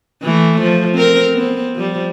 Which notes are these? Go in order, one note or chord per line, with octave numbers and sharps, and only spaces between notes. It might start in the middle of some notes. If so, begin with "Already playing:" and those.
E3 A3
F3
C4 A#4
B3 C4
F3 G3